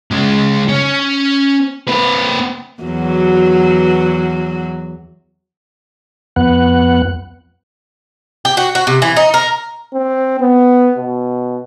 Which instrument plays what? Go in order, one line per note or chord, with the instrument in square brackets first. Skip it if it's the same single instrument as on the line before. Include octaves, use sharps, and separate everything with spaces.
[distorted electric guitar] C#3 G#3
C#4
C4 B4
[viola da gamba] E2 F#3 F#4
[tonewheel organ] F2 B3 F#5
[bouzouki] G4
F#4
F#4
C3
E3
D#4
A#4
[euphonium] C4
B3
B2